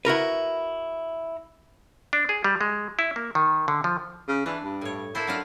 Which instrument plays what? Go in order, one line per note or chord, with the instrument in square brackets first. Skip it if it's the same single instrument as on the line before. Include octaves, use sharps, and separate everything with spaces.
[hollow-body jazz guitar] E4 F#4 A#4 B4
[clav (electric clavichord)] D4
G#4
G3
G#3
E4
A#3
D#3
D3
F3
[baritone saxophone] C#3
[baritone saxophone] E3 [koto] D4
[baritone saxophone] G2
[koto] A2 C#5
[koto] A#3 A4 C5 [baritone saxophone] E4
[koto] F#3 D4 F4